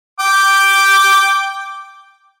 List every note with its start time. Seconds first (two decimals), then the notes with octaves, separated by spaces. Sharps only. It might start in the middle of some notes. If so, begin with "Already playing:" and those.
0.20 G5 D6